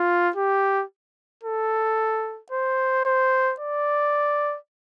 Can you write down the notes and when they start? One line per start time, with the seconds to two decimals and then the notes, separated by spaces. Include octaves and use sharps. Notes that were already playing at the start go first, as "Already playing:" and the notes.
Already playing: F4
0.36 G4
1.43 A4
2.52 C5
3.05 C5
3.60 D5